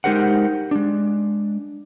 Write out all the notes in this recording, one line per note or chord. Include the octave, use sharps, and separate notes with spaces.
G#3 D#4 G4 A#4 C5 F#5
G#3 D4